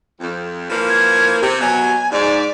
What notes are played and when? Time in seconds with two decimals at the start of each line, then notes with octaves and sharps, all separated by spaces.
0.20 F2
0.70 E3 F3 A#3
0.89 G#6
1.42 C3
1.61 B2 F#3 G#5
2.12 G#2 D5